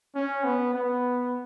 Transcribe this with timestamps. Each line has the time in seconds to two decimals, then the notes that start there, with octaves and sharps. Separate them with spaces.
0.15 C#4
0.44 B3
0.74 B3